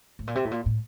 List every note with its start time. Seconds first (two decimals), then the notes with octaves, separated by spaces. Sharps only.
0.19 A2
0.27 A#2
0.35 C3
0.45 A2
0.51 A#2
0.66 A2